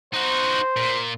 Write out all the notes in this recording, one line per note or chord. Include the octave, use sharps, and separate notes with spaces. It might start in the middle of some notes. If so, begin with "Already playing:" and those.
D#4 F#4 C5
A#2